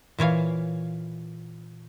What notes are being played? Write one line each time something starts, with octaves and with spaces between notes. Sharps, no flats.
A#2 E3 C#5 F5